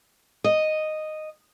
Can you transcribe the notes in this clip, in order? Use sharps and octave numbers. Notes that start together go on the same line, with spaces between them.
D#5